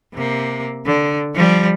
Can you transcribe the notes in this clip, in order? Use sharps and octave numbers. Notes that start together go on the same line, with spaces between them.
C3 A#3
D3
F3 G3